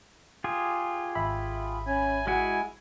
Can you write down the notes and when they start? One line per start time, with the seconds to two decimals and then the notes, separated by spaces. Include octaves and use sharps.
0.44 F4 G4 G#4
1.15 G#1 E5 B5
1.87 C#4 G#5
2.27 G#3 E4 F#4 F#5 G#5